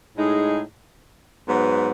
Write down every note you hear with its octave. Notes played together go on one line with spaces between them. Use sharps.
A2 G#3 D#4 G#4
G#2 F#3 B3